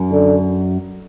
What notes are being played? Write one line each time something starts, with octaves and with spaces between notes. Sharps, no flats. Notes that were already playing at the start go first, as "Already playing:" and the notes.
Already playing: F#2
D3